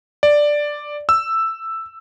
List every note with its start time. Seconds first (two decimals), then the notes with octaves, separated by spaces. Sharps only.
0.23 D5
1.09 E6